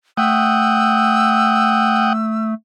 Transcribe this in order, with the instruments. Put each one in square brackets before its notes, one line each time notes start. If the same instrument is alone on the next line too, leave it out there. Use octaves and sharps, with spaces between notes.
[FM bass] A3 [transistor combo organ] F#5 G5 D#6 [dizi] E6